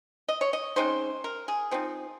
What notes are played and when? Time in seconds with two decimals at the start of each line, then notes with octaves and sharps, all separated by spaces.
0.28 D#5
0.41 C#5
0.53 D#5
0.76 C#3 G#3 C4 D#4 C5
1.24 A#4
1.48 G#4
1.71 F3 C4 D#4